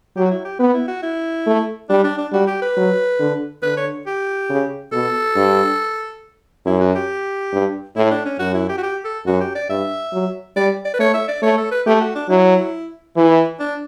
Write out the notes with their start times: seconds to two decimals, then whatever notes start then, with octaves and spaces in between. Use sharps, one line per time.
0.17 F#3 G4
0.25 F#4
0.31 E4
0.45 G4
0.59 B3 B4
0.74 E4
0.88 F#4
1.03 E4
1.46 A3
1.89 G3 D4
2.04 D4
2.18 D4
2.33 G3 F#4
2.47 G4
2.62 B4
2.77 F#3
3.19 D3
3.62 D3 B4
3.77 C#5
4.07 G4
4.50 C#3
4.92 B2 A4
5.36 G2
6.66 F#2 E4
6.80 F#4
6.95 G4
7.52 G2
7.96 A2 E4
8.11 D4
8.25 C#4
8.39 F#2 F#4
8.54 E4
8.69 G4
8.78 F#4
8.83 G4
9.05 A4
9.26 F#2 F#4
9.40 G4
9.55 D5
9.69 G2 E5
10.13 F#3
10.57 G3 D5
10.85 D5
10.94 B4
10.99 A3 C#5
11.14 E5
11.28 D5
11.42 A3 C#5
11.57 A4
11.71 B4
11.86 A3 G4
12.00 F#4
12.15 D4
12.29 F#3 E4
13.17 E3 E4
13.60 D4